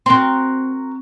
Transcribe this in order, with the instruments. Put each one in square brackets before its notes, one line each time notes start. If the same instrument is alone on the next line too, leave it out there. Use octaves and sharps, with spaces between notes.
[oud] C4 [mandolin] F#4 A#4 C6